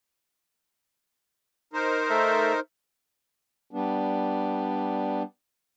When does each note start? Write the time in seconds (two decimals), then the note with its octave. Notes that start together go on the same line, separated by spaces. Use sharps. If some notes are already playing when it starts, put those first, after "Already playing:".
1.73 D#4 A#4 C5
2.10 A3 A4 E5
3.71 G3 B3 D4